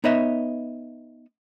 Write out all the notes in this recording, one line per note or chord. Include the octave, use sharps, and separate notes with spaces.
B3 D#4 B4 C#5 D#5 E5